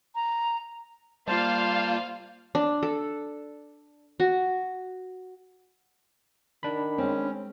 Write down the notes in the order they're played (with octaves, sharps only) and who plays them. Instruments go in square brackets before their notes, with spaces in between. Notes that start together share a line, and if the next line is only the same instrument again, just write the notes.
[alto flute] A#5
[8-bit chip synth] G3 A#3 F4 [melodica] C5 A5 [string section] F5
[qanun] D4
A4
F#4
[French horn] D#3 [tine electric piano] D4 B5
[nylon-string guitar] G#3 C4 [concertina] C#4